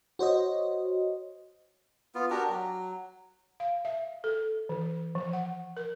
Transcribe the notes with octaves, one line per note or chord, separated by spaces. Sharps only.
F#4 C5 C#5 D#5
B3 F4
D4 F#4 G4 A#4
F#3
F5
E5
A4
E3
F3
F#5
A#4